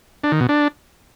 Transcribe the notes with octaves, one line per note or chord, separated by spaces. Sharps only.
D4
D#3
B2
D4